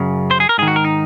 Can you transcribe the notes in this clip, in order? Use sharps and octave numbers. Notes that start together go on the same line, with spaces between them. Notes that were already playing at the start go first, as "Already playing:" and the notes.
Already playing: F#2 C#3
C5
G#4
A#4
G#2 D#3 G#4
F#4
A#4
D#4